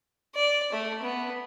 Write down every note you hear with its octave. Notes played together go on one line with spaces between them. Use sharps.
D5
A3
B3